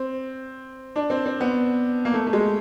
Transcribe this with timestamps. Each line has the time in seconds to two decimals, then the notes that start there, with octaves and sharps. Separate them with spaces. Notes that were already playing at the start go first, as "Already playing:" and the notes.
Already playing: C4
0.96 D4
1.10 C4
1.26 C4
1.41 B3
2.05 A#3
2.14 A3
2.27 A3
2.33 G#3